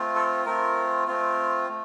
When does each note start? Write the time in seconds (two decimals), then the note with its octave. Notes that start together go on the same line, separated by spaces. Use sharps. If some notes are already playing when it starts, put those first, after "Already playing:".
Already playing: A3 C4 F4
0.16 A4
0.46 A3 C4 F4 A#4
1.08 A3 C4 F4
1.69 A3